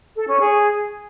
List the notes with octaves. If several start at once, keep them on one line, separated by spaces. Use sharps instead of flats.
A4
C#4
G#4